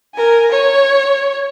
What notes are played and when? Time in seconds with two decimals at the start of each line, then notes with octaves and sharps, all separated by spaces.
0.15 A#4 G#5
0.51 C#5